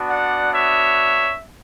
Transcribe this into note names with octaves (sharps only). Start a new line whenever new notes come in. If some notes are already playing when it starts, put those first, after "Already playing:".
Already playing: B3 D4 F#4
D5 F#5
C#5 E5